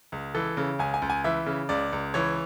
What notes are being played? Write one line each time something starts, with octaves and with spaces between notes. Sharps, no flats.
C#2
E3 A4
C#3
C#2 G#5
G#5
C#2
G#5
E3 E5
C#3
C#2 D5
C#2
E3 C#5